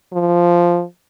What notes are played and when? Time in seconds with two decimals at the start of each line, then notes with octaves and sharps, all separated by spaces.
0.13 F3